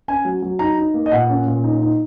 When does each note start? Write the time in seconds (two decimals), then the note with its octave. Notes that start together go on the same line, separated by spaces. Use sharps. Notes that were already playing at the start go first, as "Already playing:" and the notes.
0.08 C#4 G#5
0.25 F#3
0.42 F#3
0.59 D#4 A#5
0.77 D#4
0.94 A#3
1.06 D#5
1.12 A#2 F#5
1.29 C#4
1.47 A#2
1.64 D#4
1.82 D#4